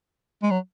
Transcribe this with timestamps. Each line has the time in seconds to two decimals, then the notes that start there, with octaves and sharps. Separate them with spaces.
0.43 G#3
0.51 F#3